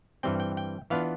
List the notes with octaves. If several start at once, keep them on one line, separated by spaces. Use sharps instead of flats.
G2 E3 G3 C4 G5
G5
G5
E3 B3 D4 F4 F5